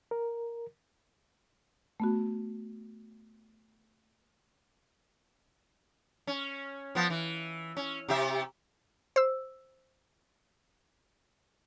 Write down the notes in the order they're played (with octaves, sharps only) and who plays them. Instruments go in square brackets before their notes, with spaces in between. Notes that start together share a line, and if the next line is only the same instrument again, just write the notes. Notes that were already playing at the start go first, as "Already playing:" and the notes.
[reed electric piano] A#4
[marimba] A3 B3 F#4
[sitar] C#4
F3 B3
E3
C#4
C3 G4 E5
[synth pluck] C5 E6